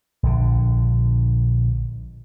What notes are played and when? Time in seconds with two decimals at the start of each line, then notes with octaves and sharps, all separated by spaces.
0.23 A#1 D3